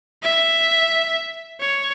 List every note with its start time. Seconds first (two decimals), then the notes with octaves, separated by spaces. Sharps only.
0.22 E5
1.60 C#5